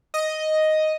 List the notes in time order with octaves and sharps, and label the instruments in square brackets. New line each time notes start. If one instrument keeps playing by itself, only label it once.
[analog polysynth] D#5